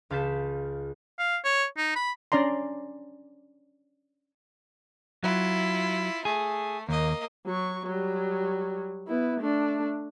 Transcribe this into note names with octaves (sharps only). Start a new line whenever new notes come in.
C#2 F5 A5 G6 B6 E7
F5
C#5
D#4
B5
C#4 D4 D5 A#5 C6
F#3 E4 F4
A3 G#4
D#2 A#3 D#5
F#3 C#6
F#3 G3
B3 E4
A3 D4